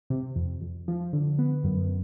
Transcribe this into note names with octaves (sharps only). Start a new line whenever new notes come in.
C3
F2
F2
F3
D3
B3
F#2